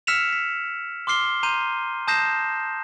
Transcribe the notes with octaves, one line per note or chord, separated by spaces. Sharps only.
E6 F6 B6 C#7 E7 F7
B6
C6 D6 F6 C7 G7
A#5 C6 G6 D#7
A5 D#6 G6 A#6 C7 E7